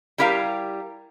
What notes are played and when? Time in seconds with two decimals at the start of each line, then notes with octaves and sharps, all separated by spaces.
0.18 G3 E4 G4 A#4 F5 A#5